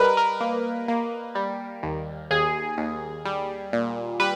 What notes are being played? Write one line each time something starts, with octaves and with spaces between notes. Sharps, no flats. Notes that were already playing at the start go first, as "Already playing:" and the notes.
Already playing: G3 A#4 B4 D#5
A#4
A#3
A#3
G3
D#2
D#2 G#4
D#2
G3
A#2
G3 B4